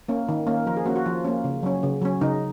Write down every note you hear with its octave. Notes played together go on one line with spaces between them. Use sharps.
A#3 C#4
D#3
A#3 C#4
F3 A#4
G#4
A#3 C#4 F#4
F#4
F3 F4
A#3 C#4
C#3
F#3 C#4
C#3
F#3 C#4
C#3 D#4